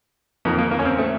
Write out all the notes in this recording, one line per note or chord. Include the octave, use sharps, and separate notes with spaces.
F2 D#3 A#3
A#3
A#3
C#4
C4
A3